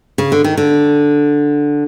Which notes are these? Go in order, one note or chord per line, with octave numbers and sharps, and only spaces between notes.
C#3
D3
D#3
D3